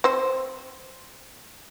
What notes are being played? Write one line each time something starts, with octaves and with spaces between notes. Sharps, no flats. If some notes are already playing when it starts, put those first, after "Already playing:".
C4 C5